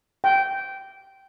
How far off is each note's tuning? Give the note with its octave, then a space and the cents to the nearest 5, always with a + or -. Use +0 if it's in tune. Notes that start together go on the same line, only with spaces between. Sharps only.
G5 -15